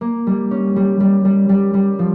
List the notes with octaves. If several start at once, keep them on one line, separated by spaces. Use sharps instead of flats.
A#3
G3
C#4
G3
G3
G3
G3
G3
F3